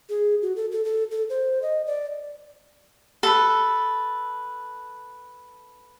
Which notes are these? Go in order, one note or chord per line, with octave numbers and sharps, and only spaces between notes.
G#4
F#4
A4
A4
A4
A4
C5
D#5
D5
A4 B4